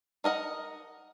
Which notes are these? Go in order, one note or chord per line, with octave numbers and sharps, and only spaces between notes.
D#4 A#4 D#5 F#5